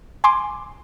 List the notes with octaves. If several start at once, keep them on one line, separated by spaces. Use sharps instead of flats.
G#5 C6 D6